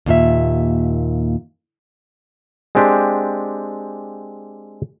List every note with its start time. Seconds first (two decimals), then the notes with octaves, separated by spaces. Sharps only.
0.06 D#2 A#2 E5
2.75 G#3 C4 D4 G4